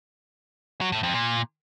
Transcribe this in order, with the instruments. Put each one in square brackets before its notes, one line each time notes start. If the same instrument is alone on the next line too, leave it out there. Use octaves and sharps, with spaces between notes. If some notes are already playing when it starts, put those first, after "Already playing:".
[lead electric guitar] F#3
A2
F2
A#2